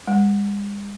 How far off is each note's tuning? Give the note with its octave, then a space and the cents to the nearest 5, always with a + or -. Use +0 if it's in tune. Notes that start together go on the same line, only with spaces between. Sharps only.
G#3 -45